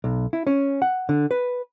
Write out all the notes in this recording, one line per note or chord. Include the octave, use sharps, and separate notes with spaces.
B1
E4
C#4
F#5
D3
B4